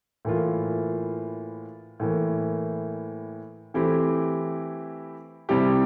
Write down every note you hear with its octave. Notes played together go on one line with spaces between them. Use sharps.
A2 E3 A#3 F4
A2 E3 A#3
E3 A3 C4 E4 G4
C3 G3 C4 E4 G4